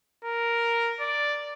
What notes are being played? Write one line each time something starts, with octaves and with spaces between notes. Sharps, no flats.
A#4
D5